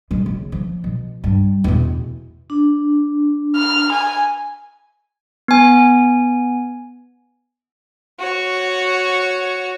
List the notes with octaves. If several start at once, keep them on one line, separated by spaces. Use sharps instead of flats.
C#3 G#3
C#3 A#3
F3
B2
G2
E2 B2
D4
F6
G#5
B3 G#5
F#4 C#5